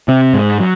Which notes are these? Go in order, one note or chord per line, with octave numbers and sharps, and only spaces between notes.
C3 C4
G#2 G#3
F#3